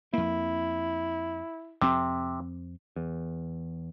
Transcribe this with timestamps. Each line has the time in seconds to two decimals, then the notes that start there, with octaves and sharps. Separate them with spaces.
0.13 F2 A#3 E4
1.82 F2 C3 C4
2.96 E2